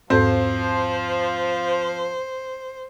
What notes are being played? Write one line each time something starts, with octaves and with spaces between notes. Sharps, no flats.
E2 G#2 F3 C4 A4 C5